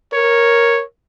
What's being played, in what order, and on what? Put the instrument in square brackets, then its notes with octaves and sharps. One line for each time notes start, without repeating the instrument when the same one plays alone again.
[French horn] A#4 [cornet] C#5